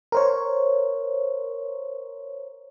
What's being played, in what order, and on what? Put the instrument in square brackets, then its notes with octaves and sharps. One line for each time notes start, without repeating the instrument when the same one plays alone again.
[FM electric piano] A#4 C5 C#5